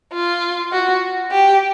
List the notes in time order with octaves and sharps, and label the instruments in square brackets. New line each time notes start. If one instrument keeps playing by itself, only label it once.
[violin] F4
F#4
G4